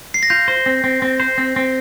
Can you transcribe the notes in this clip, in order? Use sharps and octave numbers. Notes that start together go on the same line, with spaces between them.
C7
A#6
F4 G6
C5
C4
C4
C4
C5
C4
C4